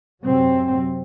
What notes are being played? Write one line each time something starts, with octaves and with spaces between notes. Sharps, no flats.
F#2 C3 F#3 C4